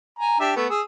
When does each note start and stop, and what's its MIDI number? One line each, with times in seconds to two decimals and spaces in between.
0.19 0.36 80
0.19 0.36 82
0.40 0.52 62
0.40 0.52 67
0.40 0.52 76
0.56 0.66 57
0.56 0.66 59
0.70 0.82 68
0.70 0.82 88